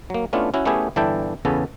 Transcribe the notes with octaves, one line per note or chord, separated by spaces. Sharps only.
F#3 A#3
A3 B3 C#4 D4 E4 F4
C#4 E4 F#4
A3 B3 C#4 E4 G4 G#4
G1 E3 D4 E4 A4 G5
E2 C#3 B3 C#4 A4